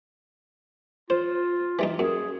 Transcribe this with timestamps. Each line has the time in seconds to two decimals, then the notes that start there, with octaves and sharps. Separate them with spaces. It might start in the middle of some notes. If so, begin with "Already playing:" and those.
1.10 F4 C5
1.79 E3 G3 D#4
1.99 F#2 G#4